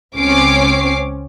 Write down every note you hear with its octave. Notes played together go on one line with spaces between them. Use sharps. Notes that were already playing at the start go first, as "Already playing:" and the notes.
C#2 C4 C#4 C#5 D6 C7